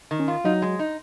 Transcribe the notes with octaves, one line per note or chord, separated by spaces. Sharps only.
D#3
C#4
F4
F#3 D#4
G#3
D#4